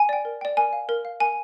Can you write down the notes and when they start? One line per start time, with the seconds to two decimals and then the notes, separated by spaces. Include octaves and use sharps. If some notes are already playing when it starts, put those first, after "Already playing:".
Already playing: G#5
0.09 D5 G5
0.25 A#4
0.41 D5 G5
0.57 A#4 G#5
0.73 F5
0.89 A#4
1.05 F5
1.20 A#4 G#5